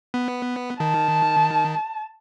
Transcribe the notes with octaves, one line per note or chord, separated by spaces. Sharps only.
B3
D#3 A5